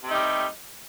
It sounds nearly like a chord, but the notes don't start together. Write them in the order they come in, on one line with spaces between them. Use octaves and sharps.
C3 A3 D#4 G3